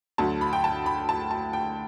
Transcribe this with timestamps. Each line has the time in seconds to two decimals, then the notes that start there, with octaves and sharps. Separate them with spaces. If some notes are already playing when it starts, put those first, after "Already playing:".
0.18 D2 D3 F#3 A5
0.41 B5
0.53 G5
0.64 A5
0.86 B5
1.09 A5
1.31 A5
1.53 G5